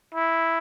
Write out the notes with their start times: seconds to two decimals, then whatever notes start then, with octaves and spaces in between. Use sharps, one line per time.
0.15 E4